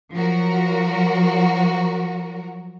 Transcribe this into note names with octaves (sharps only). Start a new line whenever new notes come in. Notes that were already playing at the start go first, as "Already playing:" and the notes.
F3 F#3 F#4 A#4